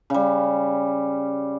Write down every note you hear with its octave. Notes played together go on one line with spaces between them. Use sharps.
C#3 G3